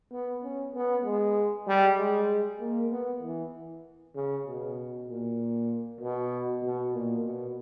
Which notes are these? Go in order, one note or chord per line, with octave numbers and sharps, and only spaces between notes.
B3
C#4
B3
G#3
G3
G#3
A#3
B3
E3
C#3
B2
A#2
B2
B2
A#2
B2